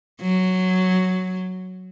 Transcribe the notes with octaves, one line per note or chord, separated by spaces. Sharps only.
F#3